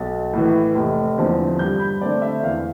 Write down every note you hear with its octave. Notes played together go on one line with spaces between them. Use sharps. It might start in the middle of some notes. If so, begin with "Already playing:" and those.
Already playing: B1 A6
A2 E3
F1
E2 D3 F3 C4
G2 G6
B5
D3 A3 C4 D5
E5
E2 F5